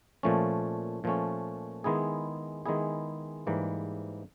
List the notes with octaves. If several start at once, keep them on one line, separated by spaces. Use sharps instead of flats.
A#2 F3 A3 C#4
A#2 F3 A3 C#4
D#3 G#3 B3 E4 G#4
D#3 G#3 B3 E4 G#4
G#2 E3 G3 A#3